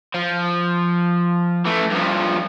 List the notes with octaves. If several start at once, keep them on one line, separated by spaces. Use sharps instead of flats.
F3
E3 A3
G2 F3